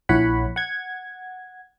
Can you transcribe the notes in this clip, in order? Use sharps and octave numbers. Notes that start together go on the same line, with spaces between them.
A#1 E4 C#5 F#5 B5
F#5 G#6